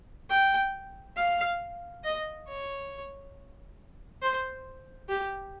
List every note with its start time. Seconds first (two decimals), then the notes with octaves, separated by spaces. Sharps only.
0.30 G5
1.17 F5
2.04 D#5
2.48 C#5
4.22 C5
5.09 G4